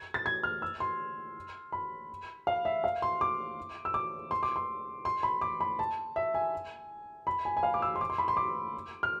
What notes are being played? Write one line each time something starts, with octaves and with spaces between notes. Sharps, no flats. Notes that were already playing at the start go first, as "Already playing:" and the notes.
Already playing: G#6
A6
G#6
F6
E6
C6
B5
F5
E5
F5
C6
D6
E6
D6
C6
D6
C6
C6
B5
D6
B5
A5
E5
G#5
B5
G#5
G#5
F5
D6
E6
C6
D6
C6
B5
C6
D6
F6